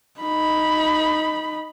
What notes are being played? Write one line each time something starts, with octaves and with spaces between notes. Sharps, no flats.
D#4 B5